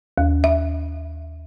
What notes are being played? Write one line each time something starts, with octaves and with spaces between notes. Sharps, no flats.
D#2
E5